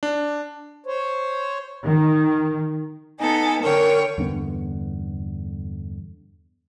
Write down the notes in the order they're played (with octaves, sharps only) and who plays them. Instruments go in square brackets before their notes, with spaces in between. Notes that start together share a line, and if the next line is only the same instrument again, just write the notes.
[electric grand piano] D4
[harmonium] C5 C#5
[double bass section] D#3
[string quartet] B3 D#4 A4 [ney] G#5
[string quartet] D3 C#5 G5 [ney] A#4
[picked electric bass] E2 G2 D3 B3